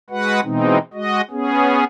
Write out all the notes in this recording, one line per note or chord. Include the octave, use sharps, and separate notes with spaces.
G#3 F#4 B4 F#5
B2 E3 G#3 C4 D#4
G#3 F#4 D#5
B3 C#4 G#4